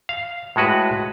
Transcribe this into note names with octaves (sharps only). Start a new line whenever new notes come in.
F5
A2 G#3 F#4 B4